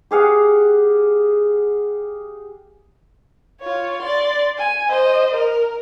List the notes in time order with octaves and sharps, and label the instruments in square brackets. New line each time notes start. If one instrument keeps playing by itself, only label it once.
[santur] G4 G#4 F5 F#5
[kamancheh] F4 C#5
D5 C6
G#5
C5 D#5
A#4